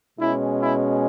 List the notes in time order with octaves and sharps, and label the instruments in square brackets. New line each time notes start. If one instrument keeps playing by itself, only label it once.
[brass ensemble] B2 G#3 C#4 E4
E4